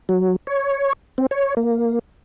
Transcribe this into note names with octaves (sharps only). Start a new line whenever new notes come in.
F#3
C#5
C4
C#5
A#3